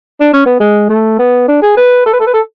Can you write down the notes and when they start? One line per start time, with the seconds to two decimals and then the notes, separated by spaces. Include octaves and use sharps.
0.20 D4
0.33 C#4
0.46 B3
0.60 G#3
0.89 A3
1.19 B3
1.48 D4
1.62 G#4
1.77 B4
2.06 A4
2.13 B4
2.20 A4
2.27 B4
2.33 A4